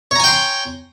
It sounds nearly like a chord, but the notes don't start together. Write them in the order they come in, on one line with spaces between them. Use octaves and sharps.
C#5 A#5 G#5 G5 C6